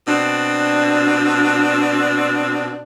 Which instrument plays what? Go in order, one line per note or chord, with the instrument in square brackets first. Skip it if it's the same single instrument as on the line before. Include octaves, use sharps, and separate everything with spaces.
[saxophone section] B2 C4 D4